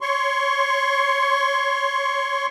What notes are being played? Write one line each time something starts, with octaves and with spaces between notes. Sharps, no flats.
C#5 C6 C#6